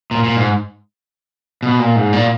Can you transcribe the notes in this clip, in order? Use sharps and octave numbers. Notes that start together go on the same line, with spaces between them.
A#2
A#2
G#2
B2
A#2
G#2
A#2